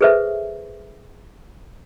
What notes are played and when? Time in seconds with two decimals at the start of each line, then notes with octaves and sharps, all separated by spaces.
0.01 G#4 A4 B4 C5 E5